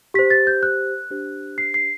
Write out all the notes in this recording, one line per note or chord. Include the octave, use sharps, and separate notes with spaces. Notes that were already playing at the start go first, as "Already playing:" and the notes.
G4 C5 B6
A6
G6
F#6
D4 G4 C5
C7
C7